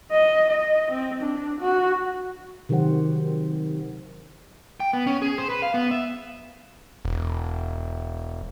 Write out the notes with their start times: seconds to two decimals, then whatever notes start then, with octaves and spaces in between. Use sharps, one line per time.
0.11 D#5
0.50 D#5
0.91 C4
1.22 D4
1.61 F#4
2.69 C3 D#3 F#3 G4 C5 F#5
4.80 G5
4.93 B3
5.07 C#4
5.22 G#4
5.38 C5
5.50 B4
5.62 F5
5.74 B3
5.91 E5
7.05 E1